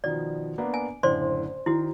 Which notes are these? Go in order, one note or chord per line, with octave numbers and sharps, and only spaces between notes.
B2 D#3 F3 D5
A#3 B3 D4
G#5
F#1 A2 D3 C5 D5 C6
D#3 E4 F#4